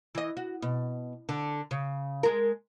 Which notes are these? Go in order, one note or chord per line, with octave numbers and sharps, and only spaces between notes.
E3 D#5
F#4
B2
D3 D4
C#3
G#3 A#4